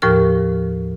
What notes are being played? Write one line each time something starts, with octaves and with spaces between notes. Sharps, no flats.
D#2 A2 F3 G4 A#4 F6